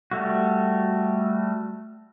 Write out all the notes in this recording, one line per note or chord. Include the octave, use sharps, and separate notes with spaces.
G3 A3 F#4